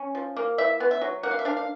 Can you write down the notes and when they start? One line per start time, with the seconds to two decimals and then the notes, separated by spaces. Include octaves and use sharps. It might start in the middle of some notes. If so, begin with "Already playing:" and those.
Already playing: C#4
0.15 F3
0.37 A#3
0.58 E4 E5
0.80 B3
0.91 E5
1.01 F#3
1.23 A#3 F#5
1.31 F5
1.39 E5
1.45 D4 F5
1.57 F5